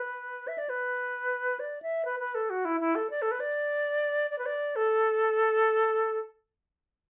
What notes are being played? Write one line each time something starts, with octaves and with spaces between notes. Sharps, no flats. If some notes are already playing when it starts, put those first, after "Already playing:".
Already playing: B4
E5
D5
B4
D5
E5
B4
B4
A4
F#4
E4
E4
A4
D5
A4
B4
D5
D5
B4
D5
A4